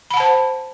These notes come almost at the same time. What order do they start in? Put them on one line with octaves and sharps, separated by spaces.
B5 F#5 A5 C5